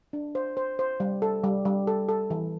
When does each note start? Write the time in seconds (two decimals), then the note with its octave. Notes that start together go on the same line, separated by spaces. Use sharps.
0.13 D4
0.35 C5
0.57 C5
0.79 C5
1.00 G3
1.22 A4
1.44 G3
1.65 G3
1.87 A4
2.09 A4
2.30 E3